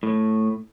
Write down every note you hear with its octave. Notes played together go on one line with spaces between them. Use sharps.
A2